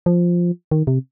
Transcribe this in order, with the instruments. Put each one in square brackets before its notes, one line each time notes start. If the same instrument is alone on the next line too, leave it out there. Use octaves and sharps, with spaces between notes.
[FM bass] F3
D#3
C3